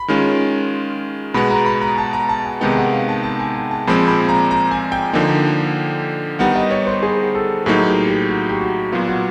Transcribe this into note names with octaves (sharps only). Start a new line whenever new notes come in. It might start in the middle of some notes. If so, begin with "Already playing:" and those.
Already playing: B5
D#3 G#3 C#4 F4
B2 G#3 B3 B5
A#5
B5
A#5
A5
A#5
A5
G#5
C3 D#3 G#3 B3 D#4 G5
F#5
F5
A5
A5
G#5
G#5
A5
A#2 F3 G#3 C4 B5
B5
A#5
A#5
G#5
G5
D3 F3 A#3 D#4
D#3 G3 B3 D#4 F#5
D#5
C#5
C5
G#4
A4
A2 F#3 A#3 D#4 G#4
G4
G4
F#4
G4
F#4
A#2 F#3 B3 F4
F#4